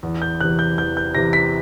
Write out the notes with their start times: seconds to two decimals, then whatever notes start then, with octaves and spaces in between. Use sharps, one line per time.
0.03 E2
0.22 G6
0.41 C3 E3 F#6
0.59 G6
0.78 E2 G6
0.97 G6
1.15 C3 E3 A#6
1.33 B6